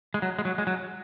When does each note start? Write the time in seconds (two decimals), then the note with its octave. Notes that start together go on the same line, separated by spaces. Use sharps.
0.14 G#3
0.22 F#3
0.39 G#3
0.45 F#3
0.58 G#3
0.67 F#3